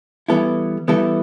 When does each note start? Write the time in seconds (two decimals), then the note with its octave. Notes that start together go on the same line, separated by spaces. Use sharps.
0.28 E3 G3 B3 E4 A4
0.88 E3 G3 B3 E4 A4